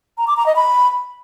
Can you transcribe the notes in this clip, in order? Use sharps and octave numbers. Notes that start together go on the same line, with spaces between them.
A#5
D6
A#5
D#5
B5